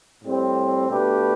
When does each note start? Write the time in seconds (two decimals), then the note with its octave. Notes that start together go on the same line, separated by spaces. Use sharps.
0.23 A2 G3 C4
0.90 B2 A3 D4 G4 B4